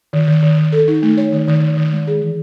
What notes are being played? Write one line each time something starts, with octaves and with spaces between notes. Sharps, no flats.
D#3
D#3
D#3
D#3
A4
D#4
A3
C#5
D#3
D#3
D#3
D#3
G#3
G#4
E3